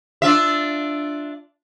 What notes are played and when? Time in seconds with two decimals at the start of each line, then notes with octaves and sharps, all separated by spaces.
0.22 D4 F4 E5